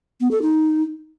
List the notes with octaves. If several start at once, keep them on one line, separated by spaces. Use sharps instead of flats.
B3
A4
D#4